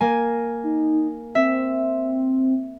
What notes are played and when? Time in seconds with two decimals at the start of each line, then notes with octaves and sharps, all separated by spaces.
0.01 A#3 G#5
0.64 D#4
1.35 C4 E5